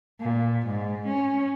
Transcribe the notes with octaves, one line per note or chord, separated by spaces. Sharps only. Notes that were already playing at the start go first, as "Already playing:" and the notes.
A#2
G#2
C#4